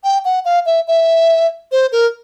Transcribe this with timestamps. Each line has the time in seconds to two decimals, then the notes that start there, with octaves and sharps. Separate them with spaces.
0.04 G5
0.25 F#5
0.45 F5
0.66 E5
0.88 E5
1.72 C5
1.92 A#4